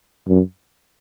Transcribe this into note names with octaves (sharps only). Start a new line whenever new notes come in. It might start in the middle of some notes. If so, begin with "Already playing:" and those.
F#2